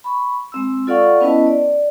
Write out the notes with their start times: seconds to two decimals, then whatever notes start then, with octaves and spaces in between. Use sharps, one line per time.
0.04 B5 C#6
0.52 G#3 C4 E6
0.87 F4 A4 D5 F5 F#5 C#6
1.21 B3 C#4 E4 B4 D#5 A5
1.47 D5